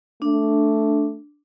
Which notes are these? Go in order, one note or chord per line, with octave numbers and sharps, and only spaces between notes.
A3 D4